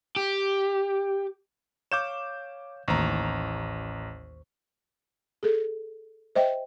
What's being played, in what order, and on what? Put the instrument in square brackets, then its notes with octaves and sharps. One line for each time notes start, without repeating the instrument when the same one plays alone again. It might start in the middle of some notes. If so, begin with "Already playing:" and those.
[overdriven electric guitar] G4
[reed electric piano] C#5 F5 [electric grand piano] D6 G6 E7
[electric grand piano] A1 A#5 [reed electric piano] D#2 C5 C#6
[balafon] G#4 A4
C5 D#5 E5 G5